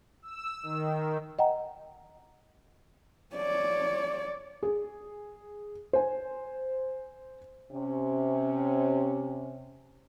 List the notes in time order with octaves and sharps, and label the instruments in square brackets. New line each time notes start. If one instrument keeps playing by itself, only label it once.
[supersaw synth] E6
D#3
[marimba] D#5 F#5 G5 A#5
[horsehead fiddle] C#5 D5
[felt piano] G#4
C5 G#5
[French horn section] C3 C#4